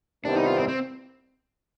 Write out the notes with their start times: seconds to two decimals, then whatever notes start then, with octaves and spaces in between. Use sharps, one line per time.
0.24 C2 C3 D#3 G3 B3 D4
0.36 D#4
0.46 F4
0.57 C4
0.68 C4